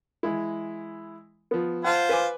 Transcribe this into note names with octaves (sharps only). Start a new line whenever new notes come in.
E3 G#3 E4
F3 B3
F4 C5 F#5 A5
B4 G#5 D6